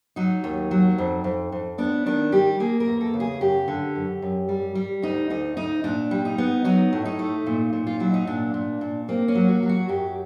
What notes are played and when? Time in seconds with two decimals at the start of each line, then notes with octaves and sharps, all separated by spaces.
0.16 F#3 D#4
0.44 D#2
0.71 F#3
0.98 F2
1.24 F2
1.52 F2
1.78 B3 D4
2.06 D#3 D4
2.32 G3 G4
2.60 A#3 G#4
2.80 A#4
2.87 E2
3.01 A4
3.14 C#3
3.20 G#4
3.41 F#2 G4
3.68 D3
3.95 F#2
4.22 F#2
4.49 G3
4.75 G3
5.02 D2 D#4
5.30 D2 D#4
5.57 D2 D#4
5.84 A#2 D4
6.11 G3
6.25 D#4
6.38 B3
6.65 F#3 D#4
6.93 A2
7.05 D#4
7.19 A3
7.46 A#2
7.73 A#2
7.87 F4
8.00 F#3 E4
8.14 D#4
8.27 A#2 D4
8.54 A#2
8.81 A#2
9.09 A#3 C4
9.28 C#4
9.35 F#3
9.48 F#4
9.63 F#3
9.69 F#4
9.89 F#2 G4